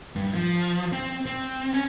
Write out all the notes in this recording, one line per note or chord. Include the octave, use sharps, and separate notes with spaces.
G2
F3
C4
C4
C#4